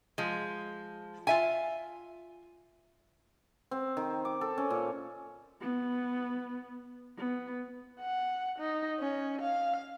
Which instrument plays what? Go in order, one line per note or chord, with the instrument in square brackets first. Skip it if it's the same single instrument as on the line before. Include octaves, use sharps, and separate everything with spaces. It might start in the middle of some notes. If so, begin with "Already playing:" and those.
[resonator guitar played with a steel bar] F3 G#3
F4 E5 G#5
[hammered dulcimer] C4
D#3
D6
A4
C#4
A#2
[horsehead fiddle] B3
B3
[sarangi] F#5
D#4
C#4
F5